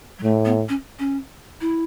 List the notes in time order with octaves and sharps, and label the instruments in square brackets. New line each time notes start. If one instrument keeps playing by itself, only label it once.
[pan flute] F#3
[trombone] A2 [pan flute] A3
[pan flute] B3
C#4
C#4
E4